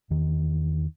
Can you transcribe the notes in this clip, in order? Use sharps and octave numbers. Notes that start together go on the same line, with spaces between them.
E2 D#3